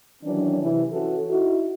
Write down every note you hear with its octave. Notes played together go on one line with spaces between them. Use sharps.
D#3 E3 F#3 C#4 D4
C3 E3
E3 C#4 F#4 A4
D#4 E4 F#4